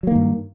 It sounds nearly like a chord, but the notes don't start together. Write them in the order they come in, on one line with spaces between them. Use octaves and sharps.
F#3 A#3 D#3 G2